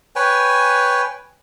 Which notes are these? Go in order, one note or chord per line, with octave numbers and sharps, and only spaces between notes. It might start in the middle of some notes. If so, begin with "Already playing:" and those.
B4 C#5 G5 G#5